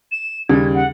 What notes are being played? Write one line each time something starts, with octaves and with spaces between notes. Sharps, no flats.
E7
D#2 C#3 G3 G#6
F#5